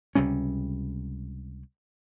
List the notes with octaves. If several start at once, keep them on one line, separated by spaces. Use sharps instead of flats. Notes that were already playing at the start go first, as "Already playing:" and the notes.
C#2 C3 G3 C#4